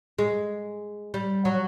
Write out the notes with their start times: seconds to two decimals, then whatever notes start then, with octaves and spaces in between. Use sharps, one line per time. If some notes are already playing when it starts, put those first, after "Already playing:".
0.19 G#3
1.14 G3
1.45 F#3